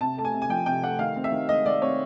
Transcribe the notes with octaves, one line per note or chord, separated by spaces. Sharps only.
C3 A5
A3 A5
G#5
C3
G#5
F3 G5
C3 G5
A3 F#5
D#3 F5
C4
E5
D#3
G#3 D#5
D#3 D5
C4 C#5